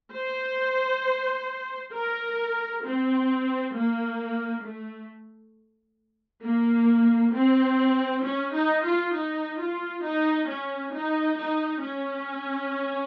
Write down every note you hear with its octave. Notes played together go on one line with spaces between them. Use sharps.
C5
A#4
C4
A#3
A3
A#3
C4
C#4
D#4
F4
D#4
F4
D#4
C#4
D#4
D#4
C#4